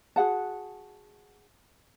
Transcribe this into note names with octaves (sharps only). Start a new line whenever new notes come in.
F#4 G#4 F#5 A5